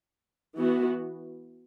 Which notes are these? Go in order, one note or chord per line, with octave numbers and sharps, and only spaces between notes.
E3 B3 F#4